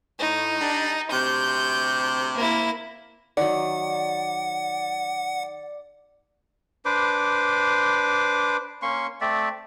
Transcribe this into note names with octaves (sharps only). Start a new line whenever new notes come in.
A2 D#4
G3 D4
D2 C3 G6
A#3 E4
D#3 F#3 D5 F#5
D4 B4 C5 D6
A#3 C#4 C6 C#6
A3 C4 D5 E5